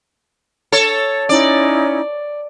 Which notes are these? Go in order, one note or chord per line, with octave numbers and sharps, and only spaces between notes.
A4 C#5
C#4 D#4 E4 D5